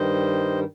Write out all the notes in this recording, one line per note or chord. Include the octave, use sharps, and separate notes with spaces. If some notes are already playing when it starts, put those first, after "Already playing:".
Already playing: G2 D#3 G3 C5 D#5